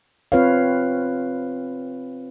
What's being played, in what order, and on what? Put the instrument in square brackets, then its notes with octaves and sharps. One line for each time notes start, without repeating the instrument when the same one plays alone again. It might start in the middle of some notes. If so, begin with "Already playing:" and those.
[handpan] C4 F4 B4 C#5 F5